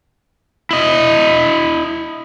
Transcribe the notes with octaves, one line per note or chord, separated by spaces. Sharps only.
E4 D#5